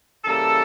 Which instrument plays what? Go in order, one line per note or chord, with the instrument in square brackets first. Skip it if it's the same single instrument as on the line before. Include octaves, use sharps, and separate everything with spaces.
[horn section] C#3 E3 G3 A#3 A4